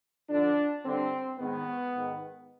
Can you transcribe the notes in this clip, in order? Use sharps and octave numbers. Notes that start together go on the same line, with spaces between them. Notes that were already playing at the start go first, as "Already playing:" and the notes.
F2 D3 D4
G2 D3 C4
G#2 D#3 B3
G#2 D#3